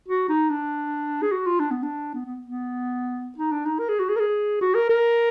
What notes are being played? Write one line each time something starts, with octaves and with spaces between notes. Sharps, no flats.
F#4
D#4
D4
G#4
F#4
F4
D4
B3
D4
B3
B3
B3
D#4
D4
D#4
A#4
G#4
F#4
G#4
A#4
G#4
F#4
A#4
A#4